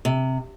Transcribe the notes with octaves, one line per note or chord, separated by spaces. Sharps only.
C3